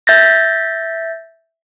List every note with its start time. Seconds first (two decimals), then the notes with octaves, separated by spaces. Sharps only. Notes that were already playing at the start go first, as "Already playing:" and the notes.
0.07 E5 G6 A6 A#6